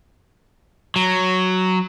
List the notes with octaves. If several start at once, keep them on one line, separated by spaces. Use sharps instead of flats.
F#3